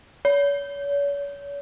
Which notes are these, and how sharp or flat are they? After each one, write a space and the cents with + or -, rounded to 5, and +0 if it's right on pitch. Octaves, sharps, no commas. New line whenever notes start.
C#5 +40